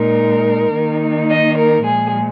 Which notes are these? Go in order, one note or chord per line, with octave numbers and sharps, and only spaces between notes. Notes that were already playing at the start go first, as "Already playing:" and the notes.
Already playing: A#2 G#3 D#4 A#4
D#3 A#3 D#4
D#5
A#4
A#2 F3 G#3 G#4